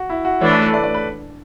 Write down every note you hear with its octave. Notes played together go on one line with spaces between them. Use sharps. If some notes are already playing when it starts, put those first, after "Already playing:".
Already playing: F#4
E4
F#4
E3 A3 D4 C#5
B4
A4
D5
D5
B4